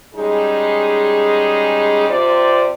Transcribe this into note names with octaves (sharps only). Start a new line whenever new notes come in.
G3 G#3 C#4 D#4 G#4
C3 C4 F4 C5 D5